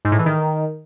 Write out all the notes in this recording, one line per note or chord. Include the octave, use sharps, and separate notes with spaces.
G#2
A2
E3
D#3